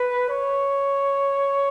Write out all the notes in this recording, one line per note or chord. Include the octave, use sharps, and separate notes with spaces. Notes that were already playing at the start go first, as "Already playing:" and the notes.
Already playing: B4
C#5